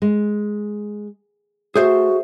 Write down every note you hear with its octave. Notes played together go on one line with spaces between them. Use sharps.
G#3
A3 F#4 G#4 C5 E5